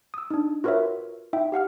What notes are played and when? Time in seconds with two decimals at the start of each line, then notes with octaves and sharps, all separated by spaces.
0.14 D#6 E6
0.31 D4 D#4
0.64 F4 F#4 A#4 B4 C#5 E5
1.33 D#4 E4 E5 G5
1.52 G4 F5 F#5 F6